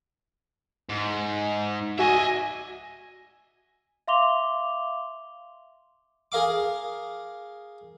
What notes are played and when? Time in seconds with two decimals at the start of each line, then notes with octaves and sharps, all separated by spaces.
0.90 G#2
1.99 F#4 D#5 E5 G#5
4.08 E5 F5 C6 D6 F7 G7
6.32 G#4 A#4 F5 D6